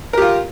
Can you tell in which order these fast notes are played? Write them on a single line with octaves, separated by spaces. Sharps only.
A#4 G4 F4